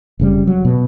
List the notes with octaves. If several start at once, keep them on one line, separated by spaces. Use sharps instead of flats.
F1 C#3 G3
F#3
B2